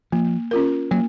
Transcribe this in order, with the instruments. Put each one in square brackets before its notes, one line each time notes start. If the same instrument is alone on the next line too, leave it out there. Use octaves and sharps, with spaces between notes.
[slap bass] F3 [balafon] A#3
[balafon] C#4 F4 A#4
[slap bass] F#3 [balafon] A#3